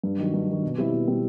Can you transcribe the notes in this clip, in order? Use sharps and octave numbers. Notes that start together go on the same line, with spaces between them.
G2
D#3 F#3
G2
D#3 F#3
B2
G3 C4 E4
B2
G3 C4 E4